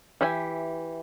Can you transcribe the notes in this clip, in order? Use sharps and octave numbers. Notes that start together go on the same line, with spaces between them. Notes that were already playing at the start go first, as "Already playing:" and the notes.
E3 G4 E5 G#5